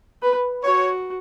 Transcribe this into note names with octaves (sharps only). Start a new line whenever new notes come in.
B4
F#4 C#5